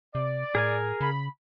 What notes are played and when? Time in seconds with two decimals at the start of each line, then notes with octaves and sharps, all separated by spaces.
0.15 C3 D5
0.55 A2 G#4 A#4 G#5
1.01 C#3 B5